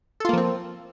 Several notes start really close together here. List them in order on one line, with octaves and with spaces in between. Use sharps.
A4 F4 A#3 F3 C4